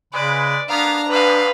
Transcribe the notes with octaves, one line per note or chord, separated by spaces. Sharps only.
C#3 G#3 B4 D5
A#3 B3 D4 F5 A#5
F2 G#2 B4 F5